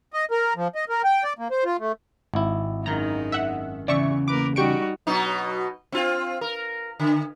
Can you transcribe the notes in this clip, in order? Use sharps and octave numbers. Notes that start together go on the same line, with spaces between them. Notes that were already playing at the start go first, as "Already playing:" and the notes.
D#5
A#4
F3
D#5
A#4
G5
D5
A#3
C5
F4
A3
G#1 E4
F#2 D#3 G#3 D#4 A#5
E5 F#5
E2 C#3 E3 D5 E5 C#6
A#3 A#4 B4 D6
G3 D#4 F#4 G4 C#6 D7
B2 F#3 D#4
C4 F4
A#4
D3